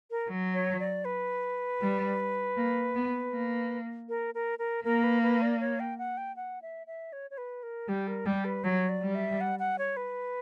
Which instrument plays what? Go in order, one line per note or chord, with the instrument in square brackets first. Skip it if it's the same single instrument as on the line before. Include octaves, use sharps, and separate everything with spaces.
[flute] A#4
[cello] F#3
[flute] C#5
D5
B4
[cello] G3
A#3
B3
A#3
[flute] A#4
A#4
A#4
[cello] A#3 [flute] A#4
[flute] B4
B4
D5
C#5
G5
F#5
G5
F#5
E5
E5
C#5
C#5
B4
A#4
[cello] G3 [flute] G4
[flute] A#4
[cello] G3 [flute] G4
[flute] B4
[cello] F#3 [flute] C#5
[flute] D5
[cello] G3
[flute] E5
F#5
F#5
C#5
B4